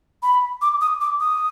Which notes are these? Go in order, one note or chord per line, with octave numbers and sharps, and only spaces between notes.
B5
D6
D#6
D6
D#6